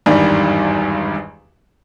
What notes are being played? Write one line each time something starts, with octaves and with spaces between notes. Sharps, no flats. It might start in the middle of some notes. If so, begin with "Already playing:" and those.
G#1 E2 G2 D#3 G3